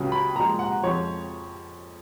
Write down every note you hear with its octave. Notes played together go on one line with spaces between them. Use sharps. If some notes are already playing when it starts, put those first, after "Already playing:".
Already playing: C#2 C#3 F#3
B5
A#2 F3 G#3 A#5
F#5
F2 F3 G#3 C#5